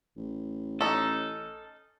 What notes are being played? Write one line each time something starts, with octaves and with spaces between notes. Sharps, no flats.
A1
C#4 D#4 A4